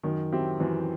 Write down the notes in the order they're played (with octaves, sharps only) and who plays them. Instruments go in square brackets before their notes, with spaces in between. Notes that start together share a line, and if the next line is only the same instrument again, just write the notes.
[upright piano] F#2 [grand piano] D#3
[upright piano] F#3 C4 E4 G4
[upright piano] F#2 [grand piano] E3